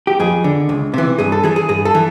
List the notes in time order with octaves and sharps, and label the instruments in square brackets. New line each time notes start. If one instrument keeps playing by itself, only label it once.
[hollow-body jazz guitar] G4
F2 G#4
D3
C#2
C3 E3
G2 G#4
A4
E3 G#4
G#4
G2 G#4
A4
E3